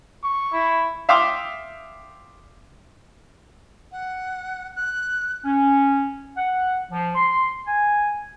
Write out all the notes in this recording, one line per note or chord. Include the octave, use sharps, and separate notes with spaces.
C#6
E4
E5 F5 G5 C6 D6 D#6
F#5
F#6
C#4
F#5
F3
C6
G#5